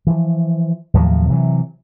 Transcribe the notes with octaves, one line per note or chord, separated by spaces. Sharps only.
E3 F3
D#2 A2 F3 F#3
C3 E3 F#3